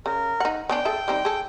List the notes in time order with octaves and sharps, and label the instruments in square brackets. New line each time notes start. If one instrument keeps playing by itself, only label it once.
[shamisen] C#3 [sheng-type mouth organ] A#4
[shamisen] D#4 F#5
[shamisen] B3 C#4 D4 [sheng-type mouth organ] G5
[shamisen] G#4 A4 E5
G3 C4 D#4
G#4 A4